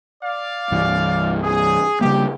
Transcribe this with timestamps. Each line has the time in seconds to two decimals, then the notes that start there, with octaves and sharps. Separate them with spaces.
0.24 D5 F5
0.71 C2 G2 E3
1.43 G#4
2.01 C#3 G3 A#3 G4